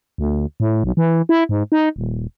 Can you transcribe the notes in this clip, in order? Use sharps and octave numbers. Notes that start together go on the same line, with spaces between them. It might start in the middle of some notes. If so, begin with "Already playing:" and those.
D2
A2
B1
E3
E4
G#2
D#4
D#1